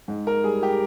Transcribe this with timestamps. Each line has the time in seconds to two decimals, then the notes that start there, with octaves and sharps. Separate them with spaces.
0.08 G#2
0.27 A#4
0.44 G3 G#4
0.63 G4